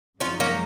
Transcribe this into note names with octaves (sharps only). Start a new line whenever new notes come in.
F#2 F3 G#3 C#4 D#4 F4
A#3 C#4